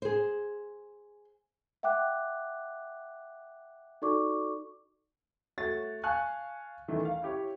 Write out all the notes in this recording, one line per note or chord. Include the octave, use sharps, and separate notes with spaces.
G#4 C5
E5 F#5 G5 D6 F#6
D#4 F#4 A4 D5 C#6 D6
A3 F#4 C#5 A6
F5 G#5 A5 C#6 F#6
D#3 E3 A3
F5
E4 G4 C#5